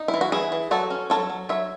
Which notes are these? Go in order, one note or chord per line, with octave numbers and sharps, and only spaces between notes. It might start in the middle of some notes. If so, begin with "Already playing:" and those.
Already playing: D#4
E4
E3
F#4
E3 E4 G#4
E3
F#3 F#4 A4
C#4
F#3 A4 C#5
F#3
F#3 C#5 E5